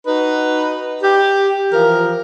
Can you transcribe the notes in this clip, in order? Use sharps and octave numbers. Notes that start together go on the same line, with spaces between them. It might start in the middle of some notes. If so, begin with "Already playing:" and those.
D#4 F#4 B4
G4
E3 F3 A#4